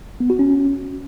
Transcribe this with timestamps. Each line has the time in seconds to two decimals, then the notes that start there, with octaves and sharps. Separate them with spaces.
0.20 B3
0.30 F#4
0.39 C#4